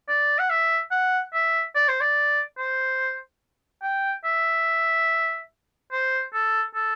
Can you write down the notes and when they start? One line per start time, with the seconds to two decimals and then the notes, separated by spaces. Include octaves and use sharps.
0.09 D5
0.39 F#5
0.50 E5
0.92 F#5
1.33 E5
1.75 D5
1.89 C5
2.01 D5
2.58 C5
3.83 G5
4.24 E5
5.92 C5
6.34 A4
6.75 A4